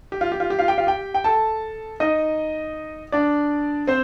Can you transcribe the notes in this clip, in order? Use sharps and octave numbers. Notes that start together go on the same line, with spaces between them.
G4
F4
G4
F4
G4
F4 F5
G4 G5
F4 F5
G4 G5
G5
A4 A5
D#4 D#5
D4 D5
C4 C5